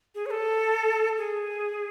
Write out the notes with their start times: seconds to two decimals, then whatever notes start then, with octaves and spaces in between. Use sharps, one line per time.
0.15 G#4
0.26 C#5
0.31 A4
1.18 G#4